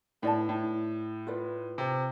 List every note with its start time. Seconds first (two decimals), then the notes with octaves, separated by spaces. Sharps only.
0.22 A2 B4 D5 A5
0.49 A2
1.27 F4 B4 D5
1.78 C3